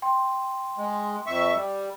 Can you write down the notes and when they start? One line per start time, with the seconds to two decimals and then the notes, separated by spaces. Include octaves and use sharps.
0.02 G5 C6
0.78 G#3
1.27 F2 E5 C#6
1.56 G3